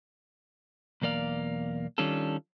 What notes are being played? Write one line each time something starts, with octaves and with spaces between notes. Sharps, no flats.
B1 E2 A#3 D5 F5
D#3 G3 C#4 D4 F4 A4